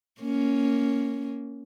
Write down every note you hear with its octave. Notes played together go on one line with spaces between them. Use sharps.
A#3 C#4